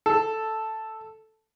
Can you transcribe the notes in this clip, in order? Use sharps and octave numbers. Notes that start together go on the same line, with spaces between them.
A4